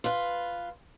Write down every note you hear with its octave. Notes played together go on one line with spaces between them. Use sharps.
F4 B4